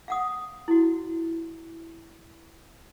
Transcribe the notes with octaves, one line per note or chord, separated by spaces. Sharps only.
F5 F#5 D#6
E4 F#4